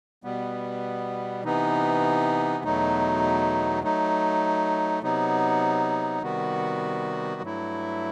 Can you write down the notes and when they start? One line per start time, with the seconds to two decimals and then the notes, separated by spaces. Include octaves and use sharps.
0.23 B2 G3 B3
1.44 C3 E3 B3 D#4
2.64 E2 B2 F#3 A3 D#4
3.83 F#3 A3 D#4
5.02 C3 F#3 B3 D#4
6.22 C3 D#3 G3 B3 F#4
7.42 G2 F#3 A3 E4